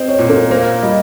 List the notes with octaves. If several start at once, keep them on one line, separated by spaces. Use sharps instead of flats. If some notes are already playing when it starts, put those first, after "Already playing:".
Already playing: C4 D#5
C#5
A#2
A#4
A#3 C5
G3 D#5